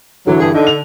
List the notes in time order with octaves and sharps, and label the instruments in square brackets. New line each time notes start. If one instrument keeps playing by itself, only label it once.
[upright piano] D3 E3 [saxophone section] F#3
[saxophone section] G2 G#4
[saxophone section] D3 [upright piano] D#4
[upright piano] F7